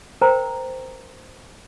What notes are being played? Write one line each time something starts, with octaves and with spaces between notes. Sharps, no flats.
A#4 C5 G5 A#5